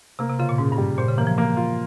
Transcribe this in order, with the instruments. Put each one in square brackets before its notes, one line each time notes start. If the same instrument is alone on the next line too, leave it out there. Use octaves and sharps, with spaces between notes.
[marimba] C3 [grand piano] A#3
[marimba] C3
[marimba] C#3 [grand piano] F4
[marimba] A#2
[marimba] G#2 [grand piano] C#3
[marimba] G2
[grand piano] G3
[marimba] A#2 [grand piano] C5
[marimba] C#3
[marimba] E3 [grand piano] A#3
[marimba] F3
[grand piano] A#3
F4